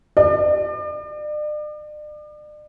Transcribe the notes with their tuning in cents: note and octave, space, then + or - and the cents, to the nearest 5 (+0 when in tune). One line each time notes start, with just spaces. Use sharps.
D5 +40